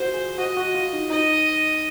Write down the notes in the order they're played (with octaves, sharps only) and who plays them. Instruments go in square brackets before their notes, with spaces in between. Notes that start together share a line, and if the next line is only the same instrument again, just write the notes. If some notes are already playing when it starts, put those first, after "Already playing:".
Already playing: [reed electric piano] F4 F#4 [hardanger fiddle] C5
[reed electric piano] G#4
[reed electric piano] F#4 [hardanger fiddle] D#5
[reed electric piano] F#4
F4
D#4
[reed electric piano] D#4 [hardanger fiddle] D#5